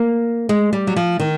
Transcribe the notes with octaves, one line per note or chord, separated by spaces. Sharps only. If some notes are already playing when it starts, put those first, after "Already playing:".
Already playing: A#3
G#3
G3
F#3
F3
D#3